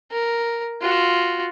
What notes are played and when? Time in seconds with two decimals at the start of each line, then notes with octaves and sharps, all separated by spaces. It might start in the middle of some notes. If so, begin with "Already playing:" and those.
0.11 A#4
0.81 F4 F#4